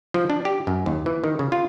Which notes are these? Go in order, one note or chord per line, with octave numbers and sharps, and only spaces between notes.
F3
D4
G4
F#2
D#2
E3
D#3
C#3
F4